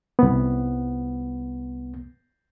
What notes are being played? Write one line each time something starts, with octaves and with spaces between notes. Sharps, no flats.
C2 B3